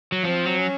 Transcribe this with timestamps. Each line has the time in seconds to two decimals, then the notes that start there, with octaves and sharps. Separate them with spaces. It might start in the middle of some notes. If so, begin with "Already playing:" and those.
0.12 F#3
0.23 F3 C4
0.45 F#3
0.58 C#4